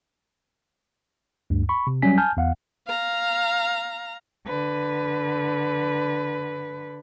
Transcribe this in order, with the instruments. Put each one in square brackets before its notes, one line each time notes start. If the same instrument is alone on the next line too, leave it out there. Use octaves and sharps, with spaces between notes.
[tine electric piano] D2 G2
B5 C#6
C3
F#3 G3 C#4 G#5 B6
G#5 A5 F6 G6
E2 F5 F#5
[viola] F5 A#5
[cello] D3 B4